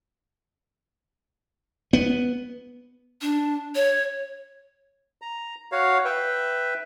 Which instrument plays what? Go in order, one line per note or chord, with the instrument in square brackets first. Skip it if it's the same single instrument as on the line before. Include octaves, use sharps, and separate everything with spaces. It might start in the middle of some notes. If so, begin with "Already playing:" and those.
[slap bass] B3
[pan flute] D4
C#5
[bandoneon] A#5
F#4 C#5 F5
B4 E5 G5